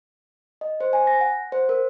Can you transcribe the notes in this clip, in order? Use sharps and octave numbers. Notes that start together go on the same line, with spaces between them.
D#5
C5
G#5
A#6
F#5
C5
A#4